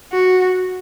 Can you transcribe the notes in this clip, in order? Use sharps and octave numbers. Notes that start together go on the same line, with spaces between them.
F#4